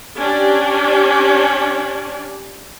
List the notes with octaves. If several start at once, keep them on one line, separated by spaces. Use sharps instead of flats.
C#4 D4 G4 D5